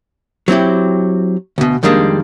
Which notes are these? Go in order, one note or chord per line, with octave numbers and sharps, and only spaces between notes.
F#3 C4 E4 G4
D2 B2
F2 D#3 G3 G#3 A#3 D4